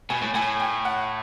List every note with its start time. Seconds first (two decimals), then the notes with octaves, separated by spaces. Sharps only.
0.10 B2 G#5
0.22 A2
0.35 A2 G#5
0.60 G5
0.85 F#5